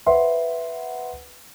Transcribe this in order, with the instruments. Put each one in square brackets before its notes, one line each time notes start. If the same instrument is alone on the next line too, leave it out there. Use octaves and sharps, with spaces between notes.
[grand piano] B4 C5 E5 F#5 C6